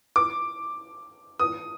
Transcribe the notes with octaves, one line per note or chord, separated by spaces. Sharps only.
D6
D#6